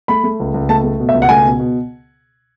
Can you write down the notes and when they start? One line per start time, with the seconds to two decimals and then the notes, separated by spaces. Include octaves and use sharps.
0.08 A3 B5
0.24 A3
0.40 C#2
0.54 C#2
0.69 A3 A5
0.84 A3
0.99 B2
1.09 E5
1.14 C#2
1.22 F#5
1.29 A3 G#5
1.45 B2
1.59 B2